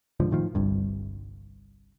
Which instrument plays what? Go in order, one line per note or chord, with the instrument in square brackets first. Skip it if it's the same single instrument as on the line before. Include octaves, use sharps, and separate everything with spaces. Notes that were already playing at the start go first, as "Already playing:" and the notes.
[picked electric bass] C#2 G#2 D3 F3
A2 D#3 F3
G1 C2 G2